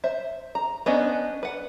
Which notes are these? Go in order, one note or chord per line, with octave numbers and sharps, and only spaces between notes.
C5 E5
A#5
B3 C#4 D4 C5 D#5
B4 F#5